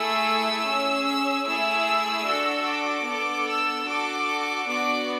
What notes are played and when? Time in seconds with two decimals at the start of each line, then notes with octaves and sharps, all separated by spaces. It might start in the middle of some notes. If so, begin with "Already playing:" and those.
Already playing: A3 E4 G#4 E6
0.67 C#4 G#4
1.06 E6
1.46 A3 E4 G#4 E6
2.26 D4 F#4 A4
2.67 D6
3.07 B3 D4 A4
3.47 E6
3.87 D4 F#4 A4 D6
4.68 B3 D4 F#4 D6